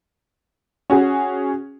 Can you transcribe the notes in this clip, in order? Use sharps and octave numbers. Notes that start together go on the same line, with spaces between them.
C#4 F#4 G#4